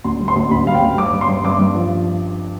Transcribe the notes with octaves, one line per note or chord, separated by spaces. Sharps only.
D2 C6
G3
C6
D2
D2 B5
G3 F5
G5
D2
G2 D6
G3
C6
G2
G2 D6
G2
F3